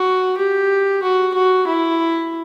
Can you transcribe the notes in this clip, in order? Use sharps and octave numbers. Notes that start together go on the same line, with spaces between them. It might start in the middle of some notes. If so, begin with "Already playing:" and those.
Already playing: F#4
G4
F#4
F#4
E4